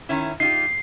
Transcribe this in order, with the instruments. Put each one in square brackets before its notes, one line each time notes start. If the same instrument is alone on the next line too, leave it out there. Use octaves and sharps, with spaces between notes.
[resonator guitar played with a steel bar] D#3 C#4 E4
[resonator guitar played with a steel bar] D#4 F4 G4 [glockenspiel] C7